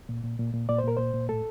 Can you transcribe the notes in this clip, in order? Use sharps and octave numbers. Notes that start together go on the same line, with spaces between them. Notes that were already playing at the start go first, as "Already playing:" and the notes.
A#2
A#2
A#2
A#2
A#2 D5
C5
A#2 A#4
A#2 C5
A#2
A2 A4